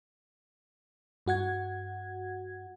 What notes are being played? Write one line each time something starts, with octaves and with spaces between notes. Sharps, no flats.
G2 F#4 F#5 G#6